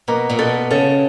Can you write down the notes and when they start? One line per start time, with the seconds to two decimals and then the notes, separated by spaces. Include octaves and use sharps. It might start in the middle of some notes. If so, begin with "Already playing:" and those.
0.08 B2 A#3
0.30 A#2
0.39 B2 A4
0.71 C#3 A4